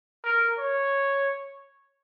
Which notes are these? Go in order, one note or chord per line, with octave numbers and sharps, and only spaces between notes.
A#4
C#5